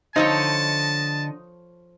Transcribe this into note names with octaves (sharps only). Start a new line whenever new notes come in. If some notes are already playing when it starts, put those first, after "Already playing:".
D3 F3 D#4 A4 C#5 D#5 A5